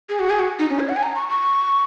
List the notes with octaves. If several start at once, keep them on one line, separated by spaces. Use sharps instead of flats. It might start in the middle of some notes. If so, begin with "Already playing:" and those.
G#4
F#4
G#4
F#4
D#4
C#4
C#5
F#5
G#5
A#5
C#6
C#6